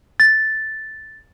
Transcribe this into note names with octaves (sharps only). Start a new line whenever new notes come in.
A6